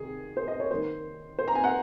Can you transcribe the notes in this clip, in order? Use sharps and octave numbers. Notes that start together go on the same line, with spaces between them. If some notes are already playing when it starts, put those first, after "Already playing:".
Already playing: C3 D#3 G#4
C5
D#5
C#5
D#3 A#3 C5
C5
A#5
G#5
F#5